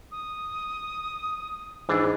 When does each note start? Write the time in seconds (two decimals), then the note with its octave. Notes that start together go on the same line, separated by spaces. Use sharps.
0.11 D#6
1.89 G#2 E3 D4